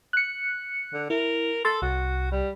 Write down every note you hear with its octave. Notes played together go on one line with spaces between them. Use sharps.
F#6 C#7
D3
E4 A#4
A4 C6 E6 A6
C2 F#4
G3